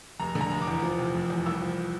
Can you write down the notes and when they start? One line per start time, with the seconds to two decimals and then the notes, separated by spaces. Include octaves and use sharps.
0.20 F1 A#5
0.35 D3
0.41 A#5
0.51 F1
0.62 D6
0.67 E2
0.83 F3
0.98 C3
1.14 F1
1.30 E2
1.46 C2 E6
1.61 F3